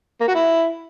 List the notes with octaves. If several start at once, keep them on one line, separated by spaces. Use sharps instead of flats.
A#3
F#4
E4